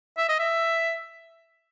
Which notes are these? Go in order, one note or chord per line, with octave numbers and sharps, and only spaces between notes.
E5
D#5
E5